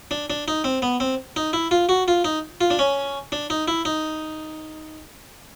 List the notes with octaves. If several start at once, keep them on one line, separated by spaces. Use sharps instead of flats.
D4
D4
D#4
C4
B3
C4
D#4
E4
F4
F#4
F4
D#4
F4
D4
C#4
D4
D#4
E4
D#4